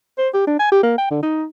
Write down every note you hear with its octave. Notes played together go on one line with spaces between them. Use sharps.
C5
G4
D4
G#5
G4
A#3
G5
D3
D#4